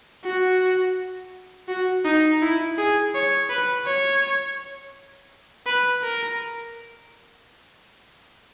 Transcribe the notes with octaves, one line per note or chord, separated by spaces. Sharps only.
F#4
F#4
D#4
E4
G#4
C#5
B4
C#5
B4
A#4